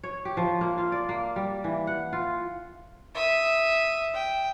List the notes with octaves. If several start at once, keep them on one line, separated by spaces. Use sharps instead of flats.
C#5
G4
F3
A#3
F4
D5
A#3
G3
E3
F#5
F4
E5 D#6
G5